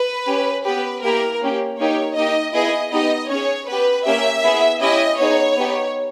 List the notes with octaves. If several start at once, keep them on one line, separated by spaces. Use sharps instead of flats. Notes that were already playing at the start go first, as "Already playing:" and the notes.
Already playing: B4
C#4 G4
B3 G4 B4
A#3 E4 G4 A#4
A#3 C#4 G4
A#3 D#4 G4 C#5
A#3 D#4 G4 D#5
B3 E4 G#4 D#5
B3 D#4 G4 D#5
C#4 G#4 C#5
B3 G4 B4
A#3 C#4 G4 E5
B3 E4 G#4
C#4 E4 G4 D#5
B3 D#4 G#4 C#5
B3 D#4 G4